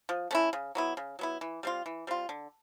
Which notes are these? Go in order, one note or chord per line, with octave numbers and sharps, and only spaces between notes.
F3
A3 C#4 E4
C#3
F#3 B3 E4
C#3
F#3 B3 E4
E3
G3 C4 F4
E3
G3 C4 F4
D3